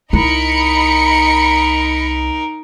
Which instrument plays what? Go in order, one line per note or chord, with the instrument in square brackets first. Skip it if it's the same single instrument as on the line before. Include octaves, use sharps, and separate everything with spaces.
[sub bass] C2 [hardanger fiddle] D#4 A#4 [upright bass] E4 [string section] D#5 B5 C#7